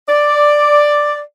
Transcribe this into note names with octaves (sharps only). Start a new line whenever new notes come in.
D5